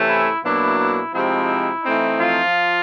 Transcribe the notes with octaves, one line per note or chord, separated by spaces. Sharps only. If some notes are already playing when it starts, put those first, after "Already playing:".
Already playing: C3 E3 A3 C#4
E4
B2 F#3 A#3 D4 E4
E4
C3 F3 G#3 C4 D#4 E4
E3 A3 C4 D#4
F3 F4